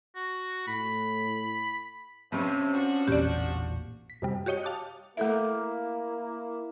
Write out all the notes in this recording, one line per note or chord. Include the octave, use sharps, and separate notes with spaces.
F#4
A2 B5
G2 C3 C4 C#4
F3 D4 F#4
A1 E2 A#2 G4 D5
B6
F#2 C3 G3
F#4 G4 C#5 D#5 G5
F5 A5 D6 D#6 F#6
A3 A#3 E4 A4 E5